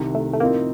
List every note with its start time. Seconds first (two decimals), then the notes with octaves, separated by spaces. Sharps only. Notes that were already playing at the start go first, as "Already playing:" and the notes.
Already playing: C2 C3 D#3
0.15 A3
0.33 A3
0.40 A2 F3 A#3 C4 D#4